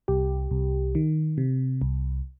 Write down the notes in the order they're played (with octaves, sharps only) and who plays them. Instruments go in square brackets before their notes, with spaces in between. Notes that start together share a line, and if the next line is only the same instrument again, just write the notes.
[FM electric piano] C2 G4
C2
D#3
C3
C2